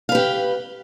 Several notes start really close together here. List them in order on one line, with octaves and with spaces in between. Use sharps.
F5 B4 G4